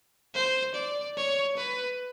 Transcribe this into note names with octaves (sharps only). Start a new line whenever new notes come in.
C5
D5
C#5
B4